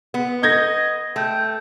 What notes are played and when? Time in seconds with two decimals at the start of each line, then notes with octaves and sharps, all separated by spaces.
0.14 B3
0.43 D#5 G6 G#6 A#6
1.16 A3 G5